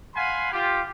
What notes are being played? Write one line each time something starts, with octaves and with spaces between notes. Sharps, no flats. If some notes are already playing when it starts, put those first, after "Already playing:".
F5 F#5 G#5 B5 C6
F4 G4